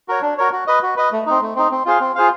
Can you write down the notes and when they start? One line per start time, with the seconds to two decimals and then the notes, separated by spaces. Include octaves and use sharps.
0.08 F#4 A#4 C#5
0.22 D4
0.38 F#4 A#4 C#5
0.52 F#4
0.67 B4 D#5
0.83 F#4
0.97 B4 D#5
1.12 A3
1.26 C4 D#4
1.42 A3
1.56 C4 D#4
1.71 C4
1.86 F4 G#4 C5 F5
2.00 C4
2.15 F4 G#4 C5 F5